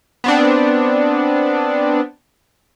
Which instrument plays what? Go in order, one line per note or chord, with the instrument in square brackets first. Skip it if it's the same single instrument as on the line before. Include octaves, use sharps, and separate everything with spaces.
[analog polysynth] B3 C4 D4